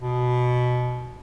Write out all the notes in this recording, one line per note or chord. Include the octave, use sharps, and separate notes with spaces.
B2